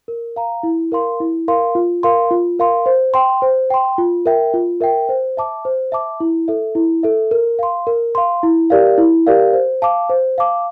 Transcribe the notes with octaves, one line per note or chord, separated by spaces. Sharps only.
A#4
F5 A#5
E4
A#4 F5 C6
E4
A#4 F5 C6
F4
A#4 F5 C6
F4
A#4 F5 C6
C5
G5 C6
C5
G5 C6
F4
A#4 E5 G5
F4
A#4 E5 G5
C5
E5 A5 D6
C5
E5 A5 D6
E4
A4 E5
E4
A4 E5
A#4
F5 C6
A#4
F5 C6
E4
G4 A#4 D5 F5
E4
G4 A#4 D5 F5
C5
F5 A5 D6
C5
F5 A5 D6